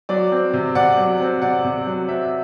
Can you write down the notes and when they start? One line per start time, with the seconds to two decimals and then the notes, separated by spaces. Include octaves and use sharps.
0.09 F#3 D5
0.32 C4
0.53 C3
0.75 C3 D5 F#5
0.98 F#3
1.20 C4
1.42 C3 D5 F#5
1.64 C3
1.86 F#3
2.08 C4 E5